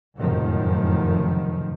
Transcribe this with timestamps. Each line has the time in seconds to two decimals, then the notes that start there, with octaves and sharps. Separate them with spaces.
0.18 F1 C#2 F#2 A2 D#3 F3